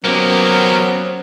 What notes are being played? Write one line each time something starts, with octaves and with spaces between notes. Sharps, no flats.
F#3 A#3 B3 C#4 G4 A#4 C5